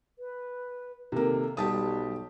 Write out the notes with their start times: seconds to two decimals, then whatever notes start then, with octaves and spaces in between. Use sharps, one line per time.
0.19 B4
1.12 C3 D#3 A#3 A4
1.57 B1 G3 G4 A5 D#6